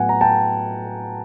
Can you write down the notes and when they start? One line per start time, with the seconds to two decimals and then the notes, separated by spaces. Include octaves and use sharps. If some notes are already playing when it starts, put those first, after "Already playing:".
Already playing: A2 F#3 B3 F#5 G#5
0.09 A#5
0.21 G5 A5